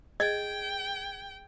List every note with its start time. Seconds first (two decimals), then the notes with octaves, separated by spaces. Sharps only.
0.20 G#4 D#5 G5 G#6